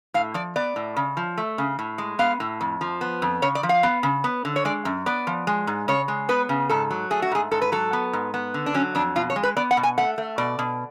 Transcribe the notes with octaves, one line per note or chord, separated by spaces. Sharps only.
A2 F5
F3 D5
B3 D5
A2
C#3
F3
A3
C#3
A2
G#3
B3 F5
A2
F2
F3
B3
F2
C#3 C#5
D5
F3
F5
B3
C#3
B3
D3
C#5
G#3 D5
F#2
B3 D5
F3
G#3
G#2
C#3 C#5
G#3
B3 B4
C#3
G#2 A4
F#3
A3 G#4
F#4
G#2 G#4
G#2 A4
B4
F#3 A4
B3
G#2
B3
D3
D4
F#3 C#4
F2 D4
B2 F4
C#5
G#3
B4
B3 D5
F#5
B2
G#5
A3 F#5
A3
B2 D5
B2